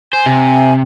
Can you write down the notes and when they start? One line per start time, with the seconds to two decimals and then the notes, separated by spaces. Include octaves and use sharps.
0.13 C5 G#5
0.26 C3